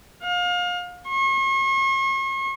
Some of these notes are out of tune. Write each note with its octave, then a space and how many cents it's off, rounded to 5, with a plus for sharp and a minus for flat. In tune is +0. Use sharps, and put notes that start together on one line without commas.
F5 +30
C#6 -45